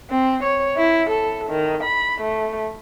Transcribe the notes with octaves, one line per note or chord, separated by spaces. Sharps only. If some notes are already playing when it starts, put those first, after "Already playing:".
C4
C#5
E4
A4
D#3
B5
A3